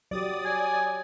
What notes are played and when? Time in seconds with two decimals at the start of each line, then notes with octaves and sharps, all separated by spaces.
0.11 F#3 F#4 G4 D5 D#6 A6
0.45 G#5